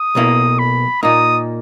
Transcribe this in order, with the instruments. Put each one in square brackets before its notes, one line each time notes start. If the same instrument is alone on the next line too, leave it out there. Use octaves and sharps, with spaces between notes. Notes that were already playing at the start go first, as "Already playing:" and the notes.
Already playing: [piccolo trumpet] D#6
[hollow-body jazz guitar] B1 B2 A#3 E4
[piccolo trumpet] B5
[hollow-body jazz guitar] A#2 A#3 D#4 [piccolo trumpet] D#6